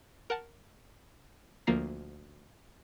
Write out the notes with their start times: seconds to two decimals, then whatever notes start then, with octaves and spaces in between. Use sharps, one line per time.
0.30 A#4 F#5 A5
1.67 D2 F3 A#3 A#5 C7